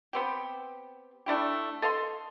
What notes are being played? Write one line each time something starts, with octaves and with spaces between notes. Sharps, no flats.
B3 C4 G4
A3 D4 E4 G4
A4 D#5 F5 C6